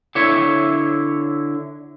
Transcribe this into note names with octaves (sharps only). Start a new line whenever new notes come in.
D3 E4 C#5 E5